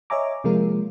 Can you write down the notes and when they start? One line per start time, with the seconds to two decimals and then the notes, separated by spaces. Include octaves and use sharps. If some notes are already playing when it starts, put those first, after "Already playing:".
0.10 C#5 D#5 E5 G#5 A#5 D6
0.44 C3 F3 G#3 A#3 F4 A#4